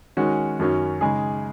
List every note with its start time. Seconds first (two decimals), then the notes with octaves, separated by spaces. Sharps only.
0.17 D#3 G#3 C#4 F#4
0.60 F#2 D#3 F#3 C#4
1.01 C#3 G#3 D#4 G#4